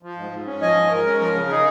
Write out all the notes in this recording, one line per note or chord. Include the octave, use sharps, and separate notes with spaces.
F3
G#2
G#2
C#4
F3 D#5 G#5
G#2
C#5
G#2 A#4
C#4
F3 A#4
C#3
D#4 G#4